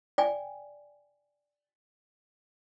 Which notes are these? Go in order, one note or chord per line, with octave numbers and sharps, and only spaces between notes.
D5 G5 G#5